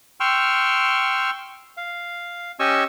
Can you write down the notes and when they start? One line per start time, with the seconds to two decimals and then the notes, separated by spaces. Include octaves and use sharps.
0.20 G5 C6 C#6 E6 F6
1.77 F5
2.60 C#4 G4 D#5 G#5 C#6 E6